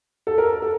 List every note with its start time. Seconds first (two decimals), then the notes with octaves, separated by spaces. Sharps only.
0.27 A4
0.38 A#4
0.62 A4